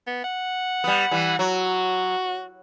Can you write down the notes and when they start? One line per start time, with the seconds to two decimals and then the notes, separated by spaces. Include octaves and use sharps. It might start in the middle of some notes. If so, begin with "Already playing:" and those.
0.07 B3
0.24 F#5
0.84 G3 B3
1.11 E3 G3
1.39 F#3 F#4